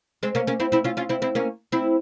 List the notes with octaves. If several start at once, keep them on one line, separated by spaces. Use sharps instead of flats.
G#3 C4
A#3 C#4
A#3 C#4
C4 E4
C4 E4
C#4 F4
C#4 F4
C4 E4
C4 E4
A#3 C#4
C4 E4